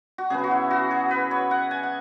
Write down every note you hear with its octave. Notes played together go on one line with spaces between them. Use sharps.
F#4
C#3 F#3 B3 G#4
F#4
E4
F#4
G#4
B4
C#5
F#5
G#5
F#5